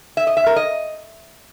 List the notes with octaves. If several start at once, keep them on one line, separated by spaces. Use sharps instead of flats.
E5
D#5
E5
A#4
D#5